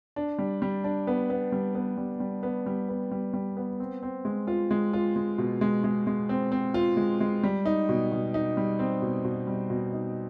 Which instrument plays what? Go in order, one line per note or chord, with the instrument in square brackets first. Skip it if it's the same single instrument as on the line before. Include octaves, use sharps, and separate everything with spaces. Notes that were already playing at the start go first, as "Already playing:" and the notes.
[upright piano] D4
G3
G3
D4
B3
B3
G3
B3
G3
G3
B3
G3
B3
G3
G3
B3
C4
C4
G#3
F4
G#3
F4
G#3
B2
G#3
G#3
G#3
C4
C4
F4
G#3
G#3
G3
D#4
B2
B2
D#4
G3
C4
B2
B2
G3
B2
D#4